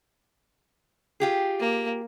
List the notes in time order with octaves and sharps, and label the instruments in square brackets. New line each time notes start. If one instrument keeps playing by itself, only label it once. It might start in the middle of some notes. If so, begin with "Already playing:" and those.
[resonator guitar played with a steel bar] F4 G4 G#4
[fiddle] A#3